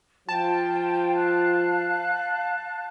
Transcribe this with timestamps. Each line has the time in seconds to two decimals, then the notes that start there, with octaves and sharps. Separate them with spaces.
0.29 F3 F4 G5 A5
1.16 F5 F#6